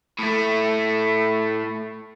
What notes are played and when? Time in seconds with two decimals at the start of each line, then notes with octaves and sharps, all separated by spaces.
0.19 A2 A3